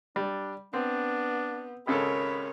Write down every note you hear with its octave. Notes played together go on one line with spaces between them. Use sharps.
G3 D4
B3 C4 D4
G#1 C#3 A4 A#4 C#5 B5